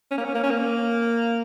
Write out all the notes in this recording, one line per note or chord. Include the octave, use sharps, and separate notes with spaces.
C#4
A#3
C#4
A#3
C#4
A#3